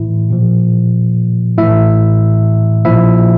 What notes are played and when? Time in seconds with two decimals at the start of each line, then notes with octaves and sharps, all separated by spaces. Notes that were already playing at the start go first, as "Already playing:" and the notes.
Already playing: A2 E3 E4
0.30 A#2 F3
1.58 A2 E3 E4 E5
2.85 A#2 F3 E4 E5